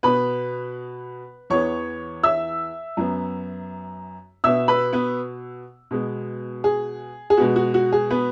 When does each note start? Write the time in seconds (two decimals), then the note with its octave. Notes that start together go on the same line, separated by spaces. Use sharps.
0.03 B2 B3 B4 B5
1.50 E2 E3 B3 C#5 C#6
2.23 E5 E6
2.97 F#2 F#3 B3
4.44 B2 B3 E5 E6
4.68 B4 B5
4.93 B3 B4
5.91 B2 G#3 B3
6.64 G#4
7.30 G#4
7.37 B2 G#3 B3 F#4
7.56 F#4
7.74 F#4
7.92 G#4
8.10 B3 B4